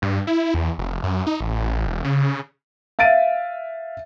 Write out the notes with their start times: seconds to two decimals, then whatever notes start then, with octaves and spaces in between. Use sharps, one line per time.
0.02 G2
0.27 E4
0.54 E2
0.78 F1
1.03 F#2
1.27 D#4
1.40 A1
1.87 E1
2.04 C#3
2.99 E5 F5 A6 D7 D#7